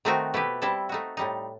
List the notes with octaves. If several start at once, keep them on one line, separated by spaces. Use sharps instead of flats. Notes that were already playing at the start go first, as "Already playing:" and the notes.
D#3 A3 C4 D#4 F#4
B2 A3 E4 G4 B4
G3 C4 E4 A4
A3 D#4 F#4
A2 G3 D#4